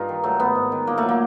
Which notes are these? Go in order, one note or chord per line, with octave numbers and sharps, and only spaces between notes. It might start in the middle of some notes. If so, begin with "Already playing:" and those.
Already playing: G2 D#4 F4
D#3
F#3 A3
G#2 B3
G#2
D#3
A#2 A#3
A3
F#3
A#3